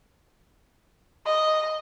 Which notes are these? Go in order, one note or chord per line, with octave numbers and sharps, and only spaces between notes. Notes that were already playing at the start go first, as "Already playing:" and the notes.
D#5